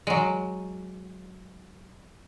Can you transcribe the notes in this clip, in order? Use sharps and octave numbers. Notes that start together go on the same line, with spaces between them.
F#3 G#3